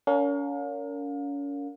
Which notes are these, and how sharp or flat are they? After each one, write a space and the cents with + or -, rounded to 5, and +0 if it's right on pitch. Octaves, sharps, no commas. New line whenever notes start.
C#4 +35 A#4 -20 F5 +35